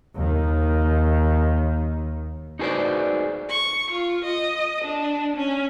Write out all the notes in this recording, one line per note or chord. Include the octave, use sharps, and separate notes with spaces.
D#2 D#3
D#4 F#4 G#4 B4 C5 D5
C#6
F4
D#5
D4
C#4